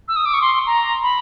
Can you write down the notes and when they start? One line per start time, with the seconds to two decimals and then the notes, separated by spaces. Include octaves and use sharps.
0.08 E6
0.16 D#6
0.26 D6
0.34 C#6
0.42 C6
0.67 A#5
1.03 B5